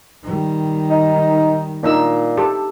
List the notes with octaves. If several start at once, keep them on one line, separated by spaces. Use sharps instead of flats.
D#3 G3
D#4
A#2 D4 D#4 E6
G4 A4